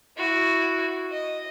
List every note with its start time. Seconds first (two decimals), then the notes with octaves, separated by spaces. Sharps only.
0.17 E4 F#4
1.12 D#5